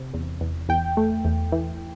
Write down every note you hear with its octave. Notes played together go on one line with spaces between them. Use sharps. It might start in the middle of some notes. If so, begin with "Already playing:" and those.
Already playing: C3
E2
E2
E2 G5
A3
E2
E3